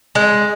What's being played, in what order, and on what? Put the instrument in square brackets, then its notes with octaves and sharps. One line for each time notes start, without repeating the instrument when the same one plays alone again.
[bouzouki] G#3